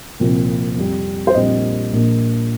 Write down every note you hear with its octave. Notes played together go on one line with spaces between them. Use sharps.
C2 A#2 F3 C4
F2 C3 G3
C5
A#1 A#2 G3 C4 D#5
A#1 A#2 A#3